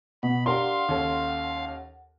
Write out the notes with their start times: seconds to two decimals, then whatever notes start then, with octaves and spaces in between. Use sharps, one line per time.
0.23 B2 F#5 B5
0.46 D4 G4 A#4 F5 C6
0.88 D#2 C#4 A4